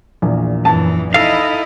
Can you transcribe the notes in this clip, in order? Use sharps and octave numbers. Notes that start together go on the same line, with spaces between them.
A#1 E2 A#2
F#2 E3 A5
D#4 E4 A4 D#5 F5